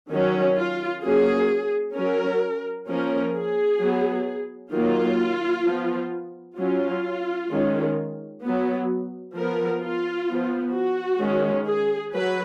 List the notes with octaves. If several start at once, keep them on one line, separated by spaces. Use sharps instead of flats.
D#3 F#3 C#4
F4
F#3 A#3 C#4 G#4
F#3 C#4 A#4
F3 A#3 C#4 A#4
G#4
F#3 B3
D#3 F#3 A#3 F4
F3 B3
F#3 C#4 F4
D#3 G#3 C#4
F#3 B3
F3 B3 A#4
F4
F3 B3
F#4
D#3 G#3 C#4
G#4
F#3 B4